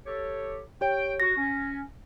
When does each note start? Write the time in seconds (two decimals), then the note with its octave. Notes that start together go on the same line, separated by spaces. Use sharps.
0.06 G4 A4 C#5
0.81 G4 C#5 G5
1.20 F#4 A#6
1.37 C#4